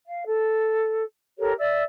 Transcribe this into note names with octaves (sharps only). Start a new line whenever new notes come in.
F5
A4
G4 A4 A#4 C#5
D5 E5 E6